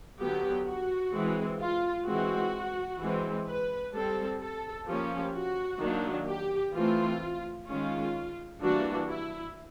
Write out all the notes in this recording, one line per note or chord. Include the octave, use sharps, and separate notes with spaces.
D3 F#3 B3 G4
F#4
E3 G#3 C4
F4
E3 G#3 C4 F#4
E3 G#3 C4
B4
G3 C4 A4
A4
F3 A#3 C#4 G4
F#4
D#3 F#3 A#3 D4
G4
E3 A3 C4 F4
D#3 G#3 C#4 F4
E3 G3 A#3 D4 F#4
E4